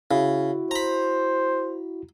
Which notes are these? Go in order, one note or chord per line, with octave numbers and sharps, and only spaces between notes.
C#3 E4 F#4
C5 A#5 B5